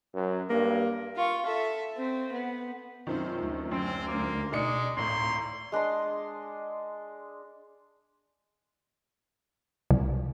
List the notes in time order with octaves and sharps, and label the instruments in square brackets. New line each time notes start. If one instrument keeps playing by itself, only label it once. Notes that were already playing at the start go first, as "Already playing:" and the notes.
[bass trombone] F#2
[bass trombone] G2 [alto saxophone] A#3
[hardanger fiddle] F4 C#6
A4 E5
C4
B3
[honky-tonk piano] F#2 C3 D#3 [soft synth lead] F4 [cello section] C5
[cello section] D2
[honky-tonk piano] F#2 [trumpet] C4 [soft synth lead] C6
[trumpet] A#3
[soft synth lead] B2 [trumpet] G#3 [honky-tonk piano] D#4 D5 C#7
[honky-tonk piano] G#1 A2 [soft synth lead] A#5 [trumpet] C6
[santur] G#3 D4 D#5 C6
[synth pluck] C2